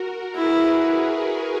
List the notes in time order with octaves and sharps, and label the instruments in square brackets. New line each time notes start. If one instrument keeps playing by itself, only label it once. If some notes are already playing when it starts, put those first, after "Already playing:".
Already playing: [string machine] F#4 A#4
[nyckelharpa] E4 [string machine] G#4 B4